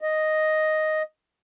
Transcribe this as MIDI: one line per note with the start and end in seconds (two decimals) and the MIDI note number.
0.01 1.02 75